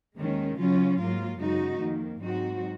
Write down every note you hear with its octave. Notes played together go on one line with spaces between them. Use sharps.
D#2 D#3 G#3 C#4
C#3 F#3 C#4 F4
G#2 F#3 A#3 F4
F#2 C#3 G#3 D#4 F#4
F2 D#3 A#3
G#2 F#3 C4 D#4 F#4